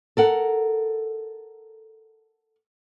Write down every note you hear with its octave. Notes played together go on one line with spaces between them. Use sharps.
A4 A#4 F#5